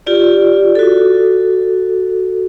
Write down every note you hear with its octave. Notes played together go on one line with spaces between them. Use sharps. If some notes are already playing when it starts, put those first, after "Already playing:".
F4 G4 D5
F#4 A4